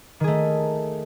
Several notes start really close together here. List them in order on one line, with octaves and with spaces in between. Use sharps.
D#3 G#4 A3